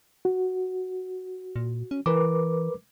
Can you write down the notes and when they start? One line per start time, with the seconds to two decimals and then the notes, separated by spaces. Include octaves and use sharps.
0.25 F#4
1.56 A#2
1.91 C#4
2.06 E3 A#4 B4 D6